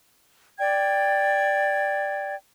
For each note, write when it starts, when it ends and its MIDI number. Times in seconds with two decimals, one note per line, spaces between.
0.58 2.35 74
0.58 2.35 79
0.58 2.35 92